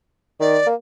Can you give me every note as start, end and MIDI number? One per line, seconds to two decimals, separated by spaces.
0.40 0.58 51
0.40 0.67 74
0.67 0.74 58